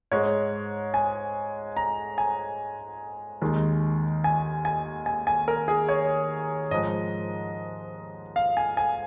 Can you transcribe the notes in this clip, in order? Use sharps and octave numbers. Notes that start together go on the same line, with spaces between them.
G#2 G#3 C#5
G#5
A#5
G#5
D#2 D#3 G#3
G#5
G#5
G#5
G#5
A#4
G#4
C#5
G#2 F3 G#3 D#5
F5
G#5
G#5